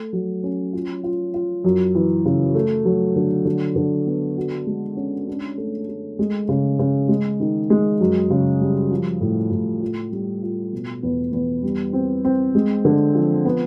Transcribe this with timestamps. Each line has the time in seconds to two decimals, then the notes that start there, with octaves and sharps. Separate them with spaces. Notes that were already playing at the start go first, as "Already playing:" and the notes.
Already playing: A3
0.13 F#3
0.44 C#4
0.73 F4
1.04 F4
1.34 F4
1.64 F#2
1.95 E3
2.25 C#3
2.55 A3
2.85 F#3
3.16 D3
3.45 D3
3.76 D3
4.07 B3
4.37 F#4
4.66 G#3
4.97 C#4
5.27 D4
5.58 A3
5.88 A3
6.19 G#3
6.49 C#3
6.79 C#3
7.09 G#3
7.40 D#3
7.70 G#3
8.00 F#2
8.30 C#3
8.61 G3
8.91 F3
9.21 A2
9.51 A2
9.81 F4
10.12 G3
10.43 F4
10.73 B2
11.03 E2
11.33 E2
11.63 G3
11.93 C4
12.25 C4
12.55 G#3
12.85 D3
13.15 F3
13.45 B3